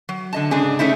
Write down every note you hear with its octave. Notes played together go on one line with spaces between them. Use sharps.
F#3
D3 D#5 A5
G#2 C#3 D4 G#4
A3 C#4 D#4 E4